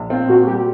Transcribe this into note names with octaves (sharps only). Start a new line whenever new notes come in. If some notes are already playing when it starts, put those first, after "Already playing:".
Already playing: A#1
C4 F4
A#2 F#4
G3 G4